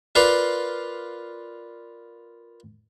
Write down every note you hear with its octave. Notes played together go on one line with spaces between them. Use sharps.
F4 A#4 B4 D5 F5